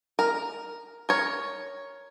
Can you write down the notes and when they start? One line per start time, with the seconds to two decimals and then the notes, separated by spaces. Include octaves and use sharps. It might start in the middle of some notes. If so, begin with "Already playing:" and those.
0.19 A#4
1.09 A#4 C#5